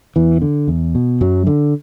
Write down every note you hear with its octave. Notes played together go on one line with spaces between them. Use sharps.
E2 E3
D3
E2
B2
F#2 F#3
D3